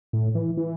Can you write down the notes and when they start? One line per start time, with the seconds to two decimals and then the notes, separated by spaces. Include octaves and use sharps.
0.13 A2
0.35 E3
0.57 E3